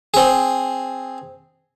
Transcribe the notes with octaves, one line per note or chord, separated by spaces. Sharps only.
C4 G#4